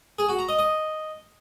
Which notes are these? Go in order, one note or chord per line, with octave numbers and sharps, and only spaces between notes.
G#4
F#4
A#5
D#5
D#5